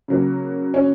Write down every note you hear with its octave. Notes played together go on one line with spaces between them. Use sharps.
C#3 F#3 A#3
C#4